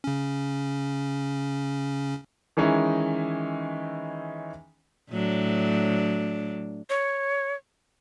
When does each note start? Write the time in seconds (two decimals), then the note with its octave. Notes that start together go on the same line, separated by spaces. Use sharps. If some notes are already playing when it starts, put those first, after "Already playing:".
0.04 C#3 C#4
2.57 D#3 E3 G#3 C#4 D#4 E4
5.10 A2 F#3 D4
6.90 C#5